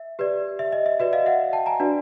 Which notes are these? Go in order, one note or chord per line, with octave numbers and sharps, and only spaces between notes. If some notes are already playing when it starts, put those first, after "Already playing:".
Already playing: E5
G4 B4 D5
E5
D#5
E5
F#4 B4 D5 E5
D#5 F5
E5 F#5
G5 A5
G#5 A#5
D4 F#4 B4 D5